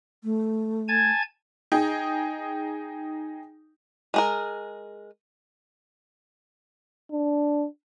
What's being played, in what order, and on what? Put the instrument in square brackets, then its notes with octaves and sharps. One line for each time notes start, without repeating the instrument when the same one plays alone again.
[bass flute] A3
[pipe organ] G#5 A5 G#6
[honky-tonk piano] D#4 G#4 G5
[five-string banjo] G#3 G#4 A#4
[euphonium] D4